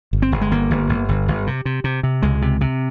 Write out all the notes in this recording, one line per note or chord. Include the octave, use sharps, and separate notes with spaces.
G1
C4
G1
G#3
G1 A#3
G1
G1
G1
G1
C3
C3
C3
C3
C#2 G#3
C3
C3